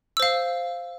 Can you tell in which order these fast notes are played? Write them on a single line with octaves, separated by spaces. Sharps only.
E6 C5 F5